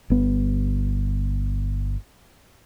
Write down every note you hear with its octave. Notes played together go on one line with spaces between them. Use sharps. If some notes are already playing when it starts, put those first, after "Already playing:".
G1 B3